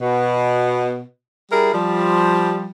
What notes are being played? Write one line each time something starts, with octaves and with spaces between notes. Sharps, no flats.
B2
G3 E4 G#4 A#4
F3 G3